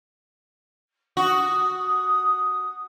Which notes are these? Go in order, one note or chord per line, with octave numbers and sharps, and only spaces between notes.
F#4 D#6